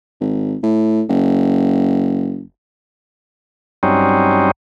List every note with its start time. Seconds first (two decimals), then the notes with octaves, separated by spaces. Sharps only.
0.21 G#1
0.63 A2
1.09 F#1
3.83 G2 F#3 G3 C4 C#4 D#4